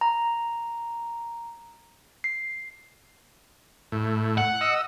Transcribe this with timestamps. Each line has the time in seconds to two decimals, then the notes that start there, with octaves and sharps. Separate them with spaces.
0.01 A#5
2.24 C7
3.92 A2
4.38 F#5
4.61 D#5 E6